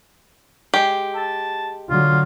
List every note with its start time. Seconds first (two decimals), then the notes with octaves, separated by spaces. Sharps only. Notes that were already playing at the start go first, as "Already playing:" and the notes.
0.74 G#3 G4
1.15 A5
1.90 D3 F#3 F4